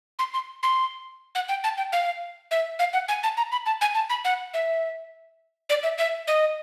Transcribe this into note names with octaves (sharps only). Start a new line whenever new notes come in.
C6
C6
C6
F#5
G5
A5
G5
F5
E5
F5
F#5
G#5
A5
A#5
B5
A5
G#5
A5
B5
F#5
E5
D5
E5
E5
D#5